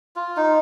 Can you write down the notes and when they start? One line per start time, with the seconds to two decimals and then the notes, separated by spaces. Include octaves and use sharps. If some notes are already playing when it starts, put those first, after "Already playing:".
0.16 F4
0.37 D#4